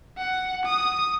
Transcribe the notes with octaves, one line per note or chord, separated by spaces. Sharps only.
F#5
D#6